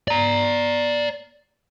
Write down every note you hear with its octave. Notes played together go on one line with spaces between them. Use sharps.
D5 A#5